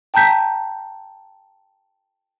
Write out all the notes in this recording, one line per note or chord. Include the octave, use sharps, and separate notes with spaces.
G5 A5 A#5 G6 B6